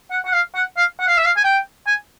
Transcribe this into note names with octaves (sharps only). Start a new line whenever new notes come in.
F#5
F#5
F5
F#5
F5
F#5
F5
E5
F5
G#5
G5
G#5